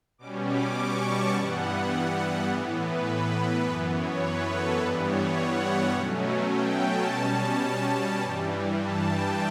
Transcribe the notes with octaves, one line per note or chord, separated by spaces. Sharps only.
B2 G3 C#4 D6
D6
C#6
A5
G2 E3 G3 B3 F#5
A2 E3 B3 D5
B4
B4
F#2 E3 B3 B4
C#5
B4
A4
G2 E3 G3 B3 B4
C#5
F#5
B2 F#3 A3 C#4
G5
A5
B2 G3 C#4
G2 E3 G3 G5
A5
G5